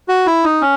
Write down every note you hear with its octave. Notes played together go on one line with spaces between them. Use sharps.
F#4
E4
D#4
C#4